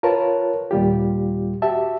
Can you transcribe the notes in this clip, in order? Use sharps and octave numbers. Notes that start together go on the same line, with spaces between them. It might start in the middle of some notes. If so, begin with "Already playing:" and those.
F4 A#4 B4 C#5 A5
D#2 A#2 G3 F4 G4
F#4 G4 E5 A5